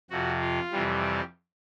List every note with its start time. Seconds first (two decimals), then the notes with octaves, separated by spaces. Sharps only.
0.10 F2 C3 F3 F#4
0.41 F4
0.72 F2 C3 E3 G3
1.03 G4